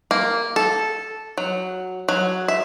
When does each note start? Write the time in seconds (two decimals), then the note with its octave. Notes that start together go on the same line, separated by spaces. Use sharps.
0.11 A#3
0.56 A4
1.38 F#3
2.09 F#3
2.48 E5